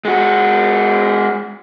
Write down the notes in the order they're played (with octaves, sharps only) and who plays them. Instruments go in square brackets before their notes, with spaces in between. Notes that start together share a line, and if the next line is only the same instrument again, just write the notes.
[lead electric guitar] G#3 F#4